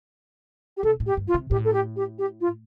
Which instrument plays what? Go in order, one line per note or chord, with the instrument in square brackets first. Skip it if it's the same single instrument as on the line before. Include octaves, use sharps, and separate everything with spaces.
[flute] G4
[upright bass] C3 [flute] A4
[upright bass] A2
[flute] G4
[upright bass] G2
[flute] F4
[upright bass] C3
[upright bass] A2 [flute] G4
[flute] A4
G4
G4
G4
F4